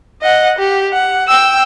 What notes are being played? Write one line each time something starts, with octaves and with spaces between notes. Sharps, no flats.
D#5 F#5
G4
F#5
G5 E6